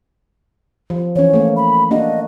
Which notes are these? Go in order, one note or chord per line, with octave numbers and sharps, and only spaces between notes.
F3
E3 C#4 C#5
A3 A#3
B5
A#3 D4 F#4 D#5